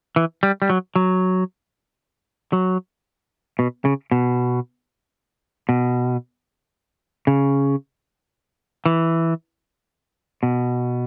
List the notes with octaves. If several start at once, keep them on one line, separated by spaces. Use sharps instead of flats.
E3
G3
G3
F#3
F#3
F#3
B2
C#3
B2
B2
C#3
E3
B2